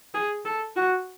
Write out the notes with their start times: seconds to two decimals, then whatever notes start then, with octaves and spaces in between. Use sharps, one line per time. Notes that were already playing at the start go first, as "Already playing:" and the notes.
0.14 G#4
0.45 A4
0.76 F#4